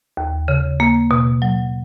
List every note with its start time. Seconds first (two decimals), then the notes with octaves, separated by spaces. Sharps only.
0.17 D#2
0.48 C#3
0.80 A#3
1.11 B2
1.42 F#3